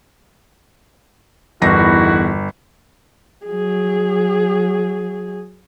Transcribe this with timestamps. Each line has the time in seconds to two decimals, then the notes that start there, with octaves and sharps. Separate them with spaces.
1.62 G1 E2 D#3 E4 F#4 A#6
3.46 F#3 G#4